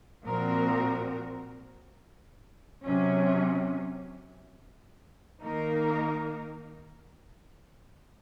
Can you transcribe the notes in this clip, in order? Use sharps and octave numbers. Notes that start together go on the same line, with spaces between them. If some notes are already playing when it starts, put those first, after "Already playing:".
A#2 F3 C4 F#4 A#4
C3 F#3 C#4
D#3 A#3 D#4 A#4